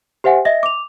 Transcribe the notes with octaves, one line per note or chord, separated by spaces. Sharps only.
G4 C5 E5 F#5 G#5
D#5 E5 A#6
D6 F7